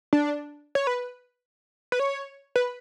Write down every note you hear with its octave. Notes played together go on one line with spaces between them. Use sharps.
D4
C#5
B4
B4
C#5
B4